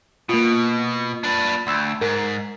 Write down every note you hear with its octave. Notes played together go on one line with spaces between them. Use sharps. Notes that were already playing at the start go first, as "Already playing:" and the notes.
B2 A#3 F4
D4 B4
D2 B5 C6 E6
G#2 A#4